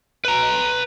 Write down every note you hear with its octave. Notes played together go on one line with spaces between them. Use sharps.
B4 A#5